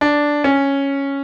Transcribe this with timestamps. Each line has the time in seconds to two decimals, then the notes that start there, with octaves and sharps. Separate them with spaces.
0.01 D4
0.44 C#4